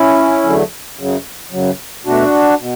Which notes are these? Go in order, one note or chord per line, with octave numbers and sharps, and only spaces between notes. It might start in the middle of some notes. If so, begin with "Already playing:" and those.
Already playing: C#4 E4
E2 D3 F#3 A3
F#2 C#3 F#3
F#2 C#3 F#3
B2 A3 D4 F#4
B2